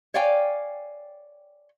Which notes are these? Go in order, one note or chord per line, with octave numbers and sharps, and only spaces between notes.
C#5 D5 F5 G5 G#5